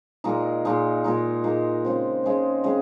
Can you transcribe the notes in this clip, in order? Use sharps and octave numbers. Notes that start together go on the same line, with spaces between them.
A#2 G#3 D#4
A#2 G#3 D#4
A#2 G#3 D#4
A#2 G#3 D#4
C#3 G#3 C4
C#3 G#3 C4
C#3 G#3 C4